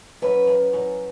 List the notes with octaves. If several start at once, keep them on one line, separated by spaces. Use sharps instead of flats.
F#2 B4
F#2
F#2